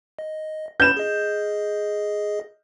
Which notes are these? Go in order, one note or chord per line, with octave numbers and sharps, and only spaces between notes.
D#5
B4 B5 G6 E7
G#4 D#5